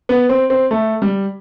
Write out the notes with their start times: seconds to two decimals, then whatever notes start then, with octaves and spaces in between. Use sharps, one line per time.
0.09 B3
0.29 C4
0.50 C4
0.71 A3
1.02 G3